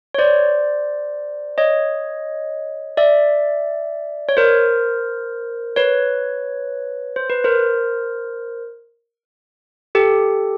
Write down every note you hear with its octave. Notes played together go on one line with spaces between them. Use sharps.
C#5
C5 D5
C#5 D#5
D5 E5
C#5
A#4 C5
B4 C#5
C5
B4
A#4 C5
G4 A4